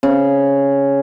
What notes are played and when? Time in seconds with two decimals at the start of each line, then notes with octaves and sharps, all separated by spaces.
0.03 C#3